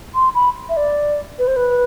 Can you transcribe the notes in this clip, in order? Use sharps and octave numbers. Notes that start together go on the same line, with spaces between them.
C6
B5
E5
D5
B4
C5
B4